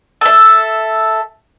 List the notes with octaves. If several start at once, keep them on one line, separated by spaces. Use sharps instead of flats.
A4 E5